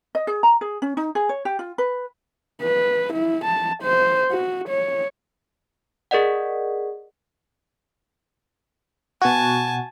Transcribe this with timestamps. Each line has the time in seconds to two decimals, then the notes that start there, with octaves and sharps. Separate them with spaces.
0.15 D#5
0.27 G#4
0.43 A#5
0.61 G#4
0.82 C#4
0.97 D#4
1.15 G#4
1.29 C#5
1.45 G4
1.59 F4
1.78 B4
2.62 B4
3.13 E4
3.44 A5
3.83 C5
4.32 F#4
4.69 C#5
6.11 G#4 A#4 D5 D#5 F#5
9.22 B2 F#4 G#5 A5